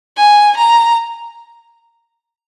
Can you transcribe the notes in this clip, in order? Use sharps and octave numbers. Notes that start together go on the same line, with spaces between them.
G#5
A#5